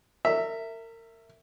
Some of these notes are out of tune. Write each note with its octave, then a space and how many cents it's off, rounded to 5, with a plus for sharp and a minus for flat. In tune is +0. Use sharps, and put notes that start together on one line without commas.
A#4 -35 E5 +0